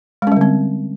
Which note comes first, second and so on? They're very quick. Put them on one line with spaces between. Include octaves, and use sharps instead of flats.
G#3 C#4 G3 D3 C4